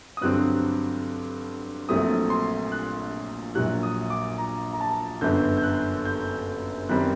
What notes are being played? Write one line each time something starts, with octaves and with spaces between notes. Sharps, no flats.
D#6
G2 D3 F#3 C4 F#6
A#1 A#2 F#3 A3 C4 D#6
C6
F#6
A#1 A#2 F#3 F#6
D#6
D6
A#5
A#5
A5
G1 F#2 D3 G6
G6
F#6
G6
F#2 D#3 G3 C4 F#6